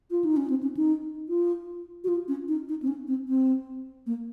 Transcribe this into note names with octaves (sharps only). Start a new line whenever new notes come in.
F4
D#4
C#4
C4
C#4
D#4
F4
F#4
F4
C#4
D#4
D#4
C4
C#4
C4
C4
A#3